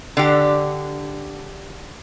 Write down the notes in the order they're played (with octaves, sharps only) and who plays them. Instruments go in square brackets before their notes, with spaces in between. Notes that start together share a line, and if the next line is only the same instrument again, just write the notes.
[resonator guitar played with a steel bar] D3 G4